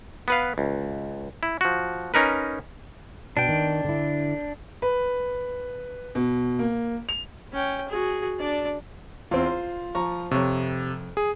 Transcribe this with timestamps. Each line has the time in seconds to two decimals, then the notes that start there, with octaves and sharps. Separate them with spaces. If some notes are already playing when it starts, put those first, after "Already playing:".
0.28 B3 B4 F5
0.58 C#2
1.43 E4
1.61 F3 F#4
2.14 C#4 D#4 A#4 B4
3.37 B2 D4 G5
3.49 D#3
3.85 D3 E4
4.82 B4
6.15 B2
6.59 A#3
7.09 F7
7.53 C#4 G5
7.89 F#4 G#4
8.39 D4 D5
9.31 E2 C4 F4
9.46 C5
9.95 F3 A#5 C#6
10.31 F2 C3 C#5 C#6
11.17 G#4